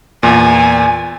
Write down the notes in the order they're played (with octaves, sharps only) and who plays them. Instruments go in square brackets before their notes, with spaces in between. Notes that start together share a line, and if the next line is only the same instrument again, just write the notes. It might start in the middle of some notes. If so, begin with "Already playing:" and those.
[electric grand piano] E2 A#2 [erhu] G#5